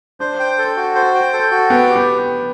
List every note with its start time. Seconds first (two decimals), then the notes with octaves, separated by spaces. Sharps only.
0.20 D4 C5
0.40 G5
0.58 A4
0.76 F#4
0.95 C5
1.15 G5
1.33 A4
1.51 F#4
1.70 B3 G5
1.90 G4
1.96 B3